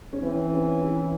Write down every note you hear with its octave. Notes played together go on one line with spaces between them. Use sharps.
C#4
E3 C4
C#4
E4